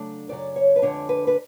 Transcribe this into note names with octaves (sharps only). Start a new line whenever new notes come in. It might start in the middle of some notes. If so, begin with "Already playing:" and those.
Already playing: C#3 F#3 A3 D4
F#2 C#3 F#3 D5
C#5
B4
F2 D3 G#3 D4 C#5
B4
B4